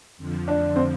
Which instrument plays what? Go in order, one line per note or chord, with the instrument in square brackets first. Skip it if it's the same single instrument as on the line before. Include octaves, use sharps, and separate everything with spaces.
[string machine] F2 D3 F3
[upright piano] D4
C4